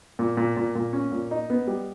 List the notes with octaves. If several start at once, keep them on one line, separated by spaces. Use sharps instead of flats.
A#2
A#2
A#2
A#2
C#4
A#2
D#4
B3
G3